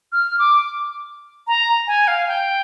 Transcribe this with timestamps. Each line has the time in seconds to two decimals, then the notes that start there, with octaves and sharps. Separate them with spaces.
0.12 F6
0.39 D6
1.47 A#5
1.87 G#5
2.08 F5
2.28 G5